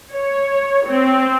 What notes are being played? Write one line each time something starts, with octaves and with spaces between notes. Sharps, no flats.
C#5
C4